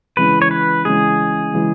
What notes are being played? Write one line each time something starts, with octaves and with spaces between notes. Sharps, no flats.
C#3 E3 G#3 B4
C#5
B4
C#3 E3 G#3 G#4
C#3 E3 G#3